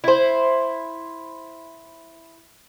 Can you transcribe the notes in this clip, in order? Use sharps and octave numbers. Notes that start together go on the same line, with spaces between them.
E4 C5